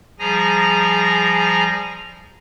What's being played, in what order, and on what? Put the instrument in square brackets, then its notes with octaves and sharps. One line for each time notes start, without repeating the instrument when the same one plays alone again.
[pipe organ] F3 G3 G#4 G#5 A#5 A#6